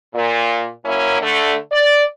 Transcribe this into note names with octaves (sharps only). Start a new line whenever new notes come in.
A#2
F#2 A#3 C#4 E4
D3 A3
D5